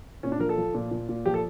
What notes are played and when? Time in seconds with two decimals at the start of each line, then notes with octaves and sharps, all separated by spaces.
0.23 A#2 C#4
0.32 D4
0.40 F3 A#4
0.49 A4
0.58 F3
0.74 A#2
0.91 A#2
1.09 A#2
1.26 F3 G4
1.34 A4